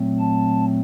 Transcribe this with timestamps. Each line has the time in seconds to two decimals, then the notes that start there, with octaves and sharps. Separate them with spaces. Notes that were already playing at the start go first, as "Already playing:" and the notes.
Already playing: A#2 F#3 A3 C4
0.19 A5